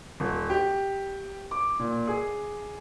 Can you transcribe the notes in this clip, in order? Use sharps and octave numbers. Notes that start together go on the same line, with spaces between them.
D#1
G4
D6
A#2
G#4